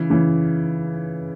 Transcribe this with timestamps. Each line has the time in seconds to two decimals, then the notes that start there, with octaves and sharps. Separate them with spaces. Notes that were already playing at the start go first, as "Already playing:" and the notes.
Already playing: C#3 E3
0.10 C#3 E3